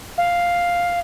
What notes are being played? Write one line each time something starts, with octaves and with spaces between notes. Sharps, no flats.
F5